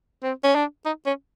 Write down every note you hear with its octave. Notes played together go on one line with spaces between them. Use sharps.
C4
C#4
D4
D#4
C#4